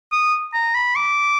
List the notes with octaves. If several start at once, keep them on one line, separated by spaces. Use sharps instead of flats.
D#6
A#5
B5
D6